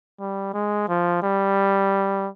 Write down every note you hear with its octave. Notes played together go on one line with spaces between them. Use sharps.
G3
G#3
F3
G3